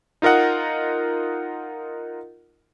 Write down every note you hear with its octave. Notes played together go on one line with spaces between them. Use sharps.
D#4 F4 A#4 D#5 F#5